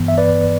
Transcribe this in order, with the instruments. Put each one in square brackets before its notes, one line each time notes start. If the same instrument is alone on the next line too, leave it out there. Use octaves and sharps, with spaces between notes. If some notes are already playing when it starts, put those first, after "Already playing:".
Already playing: [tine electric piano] G2 E3 B3
E5
B4 D5